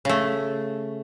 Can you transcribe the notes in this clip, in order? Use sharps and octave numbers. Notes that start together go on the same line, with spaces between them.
C#3 A3